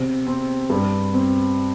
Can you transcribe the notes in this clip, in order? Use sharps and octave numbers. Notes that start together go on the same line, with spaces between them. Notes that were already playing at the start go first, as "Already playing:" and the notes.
Already playing: C3
C4
G2
C4